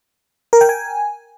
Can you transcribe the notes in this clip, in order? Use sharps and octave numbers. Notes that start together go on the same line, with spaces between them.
A#4
G5
G#5